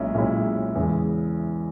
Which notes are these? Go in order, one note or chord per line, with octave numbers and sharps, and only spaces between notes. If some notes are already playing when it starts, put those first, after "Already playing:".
Already playing: B1 A#2 G#3 C#4 E4
B1 A#2 G#3 C#4 E4
E2 C#3 G#3